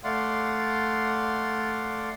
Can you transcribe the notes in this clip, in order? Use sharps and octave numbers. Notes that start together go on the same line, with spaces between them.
A3 D5 F5 F#5 C6